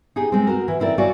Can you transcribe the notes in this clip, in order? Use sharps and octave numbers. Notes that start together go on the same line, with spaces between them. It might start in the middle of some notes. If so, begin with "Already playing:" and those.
D#4 G4 G#4
G#3 C4
F#4 A#4
E3
C4 E4 A#4 D5
F#4 C#5 D5 F5 G#5